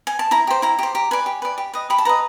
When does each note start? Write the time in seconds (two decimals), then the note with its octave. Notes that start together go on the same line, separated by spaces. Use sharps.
0.07 G#5
0.19 A5
0.31 E4 A#5
0.47 G4 C5
0.62 E4 A#5
0.79 G4 C5
0.95 G4 A#5
1.11 B4 D5 G#5
1.26 G4
1.42 B4 D5
1.58 G4
1.74 B4 D#5
1.90 G4 B5
1.98 A5
2.05 B4 D#5 A#5